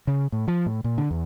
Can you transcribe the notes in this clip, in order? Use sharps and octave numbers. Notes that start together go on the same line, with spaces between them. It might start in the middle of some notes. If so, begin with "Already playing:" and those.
C#3
A2
F3
A2
A#2
D3
E2